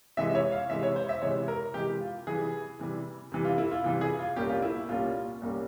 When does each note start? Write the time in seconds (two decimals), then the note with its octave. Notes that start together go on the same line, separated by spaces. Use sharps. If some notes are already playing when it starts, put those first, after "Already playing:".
0.17 C3 E3 G#3 E5
0.30 E5
0.35 C#5
0.52 F5
0.70 C3 E3 G#3 E5
0.83 C#5
0.96 C5
1.09 E5
1.22 C3 E3 G#3 C#5
1.48 A#4
1.74 C3 E3 G#3 G4
2.00 F4
2.27 C3 E3 G3 G#4
2.79 C3 E3 G3
3.32 C3 E3 G3
3.45 F4
3.58 E4
3.71 F4
3.84 C3 E3 G3 F4
4.01 G#4
4.19 F4
4.36 C2 A#2 G3 A#3 C#4 G4
4.49 F4
4.62 E4
4.88 C2 A#2 G3 A#3 C#4 F4
5.42 C2 A#2 G3 A#3 C#4